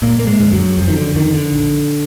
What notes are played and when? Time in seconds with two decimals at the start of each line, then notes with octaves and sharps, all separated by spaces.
0.02 F#1 A#2 A#3
0.19 A#3
0.27 G#2 G#3
0.40 F2 D3
0.52 F#2 F#3
0.78 F#1 F2 F3
0.88 D#3
0.96 D3
1.15 F2 D3 D#3
1.34 D3
1.53 A#1